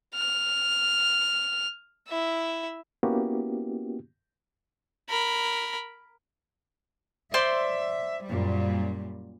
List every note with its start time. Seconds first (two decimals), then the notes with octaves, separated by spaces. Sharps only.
0.14 F6
2.08 E4 E5
3.03 A#3 B3 C#4 E4 F#4 G4
5.09 A#4 B5
7.34 C5 D5 E5 C6
8.26 F#2 A#2 G3